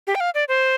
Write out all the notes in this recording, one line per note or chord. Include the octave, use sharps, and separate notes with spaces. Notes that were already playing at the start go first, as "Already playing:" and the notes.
G4
G5
F5
D5
C5